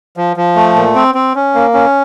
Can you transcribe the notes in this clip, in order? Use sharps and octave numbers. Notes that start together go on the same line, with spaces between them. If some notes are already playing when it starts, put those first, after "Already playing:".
F3
F3
A3
A#2
C4
C4
C#4
A#3
C#4